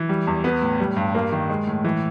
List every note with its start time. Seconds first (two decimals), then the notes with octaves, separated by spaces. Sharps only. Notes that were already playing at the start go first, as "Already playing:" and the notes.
Already playing: E3
0.09 G3
0.27 E2
0.44 B3
0.62 A2
0.80 G3
0.96 G2
1.15 A#3
1.32 D#3
1.50 G#3
1.67 A2
1.84 E3